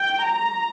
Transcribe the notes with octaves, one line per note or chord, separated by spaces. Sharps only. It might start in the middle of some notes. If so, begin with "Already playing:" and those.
Already playing: G5
A#5